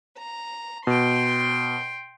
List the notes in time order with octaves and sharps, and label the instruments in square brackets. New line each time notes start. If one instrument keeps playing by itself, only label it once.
[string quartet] A#5
[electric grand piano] B2 [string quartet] G5 C6